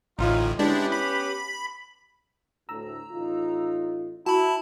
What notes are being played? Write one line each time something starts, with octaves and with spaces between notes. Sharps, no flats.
A1 D2 A2 D#4 F4
G#3 B3 C#4 D4 E4 G4
B5
D2 A2 A#5 E6
A1 D#4 F4
E4 F#4 A5 B5